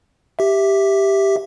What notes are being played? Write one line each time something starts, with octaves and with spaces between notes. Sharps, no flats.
G4 E5